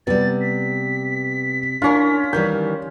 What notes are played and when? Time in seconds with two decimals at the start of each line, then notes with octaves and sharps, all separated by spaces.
0.07 C3 G3 B3 A6
0.41 B6
1.82 C#4 D4 E4 F4 A#4
2.33 D#3 E3 G3 G6